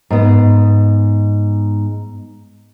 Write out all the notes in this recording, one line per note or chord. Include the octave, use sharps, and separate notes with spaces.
G#2 B3